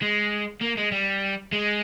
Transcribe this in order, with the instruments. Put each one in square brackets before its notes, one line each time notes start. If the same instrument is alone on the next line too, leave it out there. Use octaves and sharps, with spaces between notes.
[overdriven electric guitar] G#3
A#3
G#3
G3
G#3